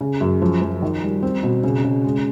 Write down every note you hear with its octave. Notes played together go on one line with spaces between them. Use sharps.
C#3
F#2
F3
F3
D#3
G3
C4
B2
C#3
C#3
G#3